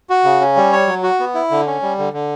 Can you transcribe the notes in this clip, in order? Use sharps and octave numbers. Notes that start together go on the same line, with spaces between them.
F#4
C#3
C#4
G3
C#5
F#3
F#4
B3
E4
D3
C#4
G3
D3
D3